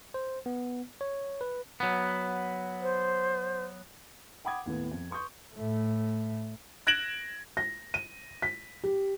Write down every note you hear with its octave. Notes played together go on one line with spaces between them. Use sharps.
C5
B3
C#5
B4
F#3 B3
C5
F#5 G5 B5 D6 D#6 G#6
D#2 A2 B3
F2
B4 C6 C#6 D#6 G6
A2 A3
F#6 G#6 A#6 D7 E7 F#7
A#6
D#7
B6
G4